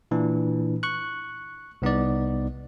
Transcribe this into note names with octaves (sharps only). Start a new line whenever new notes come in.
A#2 E3 D4
C#6 F#6
C2 B3 D#4 D5